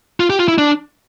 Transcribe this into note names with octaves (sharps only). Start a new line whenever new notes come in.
F4
G4
F4
E4
D4